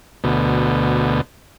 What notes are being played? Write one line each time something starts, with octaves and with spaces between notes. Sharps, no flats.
D2 B2